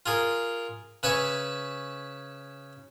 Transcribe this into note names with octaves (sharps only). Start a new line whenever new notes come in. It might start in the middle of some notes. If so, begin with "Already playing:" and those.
F4 G#4 A#4
C#3 B4 E5 G#5 C#6